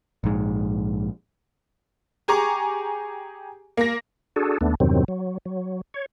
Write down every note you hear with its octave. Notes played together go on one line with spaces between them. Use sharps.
A#1 G#2
G4 G#4 G#5 A#5 C#6 D6
A#3 A#6
D4 F#4 G#4 A4
D#2 A3 B3 D4
E2 G2 C3 D#3 F#3 C4
F#3
F#3
C#5